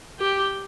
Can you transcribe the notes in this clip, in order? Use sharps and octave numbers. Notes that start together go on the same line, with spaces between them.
G4